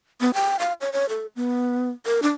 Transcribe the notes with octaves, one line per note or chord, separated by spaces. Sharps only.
B3
G5
F5
C#5
C#5
A4
B3
A#4
D4